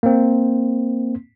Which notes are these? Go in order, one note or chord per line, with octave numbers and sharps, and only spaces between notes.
A#3 C4